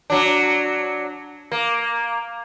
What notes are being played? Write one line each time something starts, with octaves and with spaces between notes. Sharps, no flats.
F#3 D4
A#3